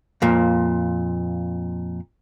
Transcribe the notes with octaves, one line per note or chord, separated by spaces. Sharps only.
F2 A#2